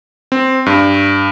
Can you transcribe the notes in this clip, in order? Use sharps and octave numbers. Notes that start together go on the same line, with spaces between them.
C4
G2